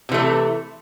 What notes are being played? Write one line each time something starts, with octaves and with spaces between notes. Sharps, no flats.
C3 E3 A3